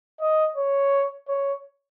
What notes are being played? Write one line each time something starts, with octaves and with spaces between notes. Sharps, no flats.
D#5
C#5
C#5